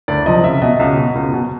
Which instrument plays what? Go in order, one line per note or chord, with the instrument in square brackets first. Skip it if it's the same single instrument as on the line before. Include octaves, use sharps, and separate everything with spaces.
[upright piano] D2 D5
C3 F3 D#5
C#2 E5
B2 D#5
C#2
B2
C#2
B2